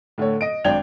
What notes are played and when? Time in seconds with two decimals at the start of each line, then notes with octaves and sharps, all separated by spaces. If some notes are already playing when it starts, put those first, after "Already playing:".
0.18 A2 D3 A3 C#5
0.41 D#5 D7
0.64 G#1 D4 G5 G#6 F7